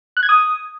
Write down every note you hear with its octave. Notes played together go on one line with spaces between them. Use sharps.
F#6
G#6
D#6